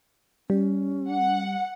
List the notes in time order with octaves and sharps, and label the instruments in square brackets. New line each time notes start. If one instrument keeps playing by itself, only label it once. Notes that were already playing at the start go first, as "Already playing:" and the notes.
[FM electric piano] G3 [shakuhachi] C#4
[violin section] F#5